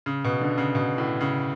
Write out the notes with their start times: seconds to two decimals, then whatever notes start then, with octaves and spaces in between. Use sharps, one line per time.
0.06 C#3
0.24 B2
0.41 D3
0.58 C#3
0.75 B2
0.98 A2
1.21 C#3